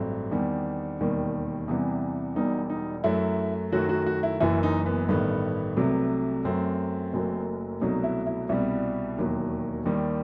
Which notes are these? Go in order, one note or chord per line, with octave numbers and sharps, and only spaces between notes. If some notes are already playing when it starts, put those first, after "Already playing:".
Already playing: A1 G2 F#3 A3 C4
E2 D#3 G3
E1 D#2 D#3 G3
E2 C3 E3 G3
E1 E2 B2 G3 D#4
D#4
F#2 F#3 A3 E4
F#2 D#3 F#3 A3 F#4
F#4
F#4
E4
F#1 F#2 E3 E4
D#4
B3
A1 G2 D#3 A3 B3
C2 C3 F#3 A3
F#2 F#3 A3 C4
F#1 F#2 F#3 A3
C2 B2 F#3 A3 D#4
E4
E4
C2 B2 G3 E4
E1 D#2 D#3 F#3
D#2 D#3 G3